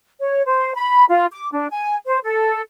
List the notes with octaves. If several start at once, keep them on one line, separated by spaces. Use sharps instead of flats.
C#5
C5
B5
F4
D6
D4
G#5
C5
A4